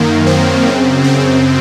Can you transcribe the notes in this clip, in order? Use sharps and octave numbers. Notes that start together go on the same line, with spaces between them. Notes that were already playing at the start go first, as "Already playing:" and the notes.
Already playing: F#2 D#3 A#3
C4
F#2 C#3
C4